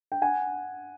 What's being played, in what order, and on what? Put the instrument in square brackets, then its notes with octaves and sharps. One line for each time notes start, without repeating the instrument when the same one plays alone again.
[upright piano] G5
F#5 G#5